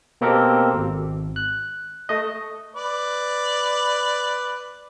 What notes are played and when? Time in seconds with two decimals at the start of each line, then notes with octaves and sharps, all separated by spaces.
0.21 B2 A#3 C4 G4 A4 A#4
0.74 G#1
1.36 F#6
2.09 A3 D#5
2.76 B4 D5